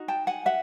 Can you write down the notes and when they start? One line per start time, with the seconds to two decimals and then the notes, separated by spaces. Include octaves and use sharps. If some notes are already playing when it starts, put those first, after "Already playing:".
Already playing: D#4 F#4
0.08 G5 A5
0.27 F#5 G#5
0.46 E5 F#5